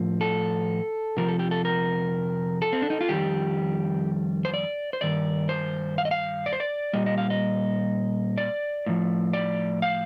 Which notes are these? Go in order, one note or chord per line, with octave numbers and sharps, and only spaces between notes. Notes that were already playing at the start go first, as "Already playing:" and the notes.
Already playing: A2 F3
A4
F2 C3 F3 A#4
A4
G4
A4
A#4
A4
C4
D4
D#4
F4
F2 D#3 G3 G4
C5
D5
C5
G2 D#3 D5
C5
F5
D#5
F5
D5
C5
D5
A#2 G3 D#5
D#5
F5
D#5
D5
A2 F3
D5
F5